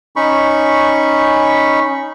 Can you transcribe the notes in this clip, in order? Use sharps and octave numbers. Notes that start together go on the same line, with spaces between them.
C#4 D#4 B5 C#6